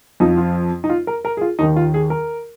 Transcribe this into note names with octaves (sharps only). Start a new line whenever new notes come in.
F2 F3 D#4
F4
D#4
F4
A#4
A#4
G#4
F4
D#2 D#3 D#4
F4
G#4
A#4